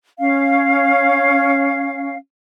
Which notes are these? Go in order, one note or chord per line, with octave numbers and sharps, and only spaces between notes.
C#4 F5